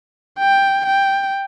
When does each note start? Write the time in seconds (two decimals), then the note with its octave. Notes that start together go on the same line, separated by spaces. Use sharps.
0.39 G5
0.86 G5